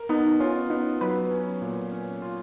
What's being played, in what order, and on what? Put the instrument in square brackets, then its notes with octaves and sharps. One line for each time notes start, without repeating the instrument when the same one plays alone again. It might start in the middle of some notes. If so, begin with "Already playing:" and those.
Already playing: [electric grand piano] A#4
[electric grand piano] B3 [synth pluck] D#4
[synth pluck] C#4 [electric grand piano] F4
[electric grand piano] B3 [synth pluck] D#4
[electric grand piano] F#3 [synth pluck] B4
[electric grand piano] C#4
A#2
C#4
F4